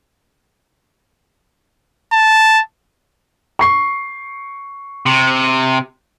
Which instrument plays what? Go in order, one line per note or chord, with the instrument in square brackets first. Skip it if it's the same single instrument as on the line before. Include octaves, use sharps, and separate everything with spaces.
[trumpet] A5
[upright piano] C#6 C7
[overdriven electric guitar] C3